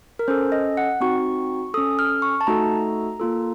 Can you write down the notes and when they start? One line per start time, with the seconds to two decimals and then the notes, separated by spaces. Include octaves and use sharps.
0.19 A#4
0.28 C#4 A4 C5
0.52 D#5
0.77 F#5
1.01 C4 D#4 F#4 C#6
1.74 C#4 A4 D#6
1.99 F6
2.22 C#6
2.41 A5
2.47 A3 D#4 F#4 A4 A#5
3.20 A#3 F4 A4